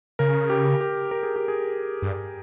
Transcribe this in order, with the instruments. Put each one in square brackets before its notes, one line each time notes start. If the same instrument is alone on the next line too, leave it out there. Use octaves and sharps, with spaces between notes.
[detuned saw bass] C#3 [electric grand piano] A#4
[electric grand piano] G4
G4
A#4
G#4
G4
G#4
[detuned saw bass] G2